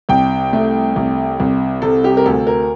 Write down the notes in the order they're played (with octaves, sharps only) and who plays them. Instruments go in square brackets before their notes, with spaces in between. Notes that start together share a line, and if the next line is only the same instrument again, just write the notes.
[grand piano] C2 G5
A3
C2
C2
C3 A4
G4
A#4
D2 A4
A#4